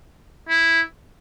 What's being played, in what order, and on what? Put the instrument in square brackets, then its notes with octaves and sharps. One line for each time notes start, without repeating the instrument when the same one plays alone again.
[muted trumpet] E4